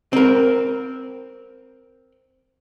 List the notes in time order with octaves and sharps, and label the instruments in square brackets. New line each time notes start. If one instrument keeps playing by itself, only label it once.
[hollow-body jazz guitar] C4 A#4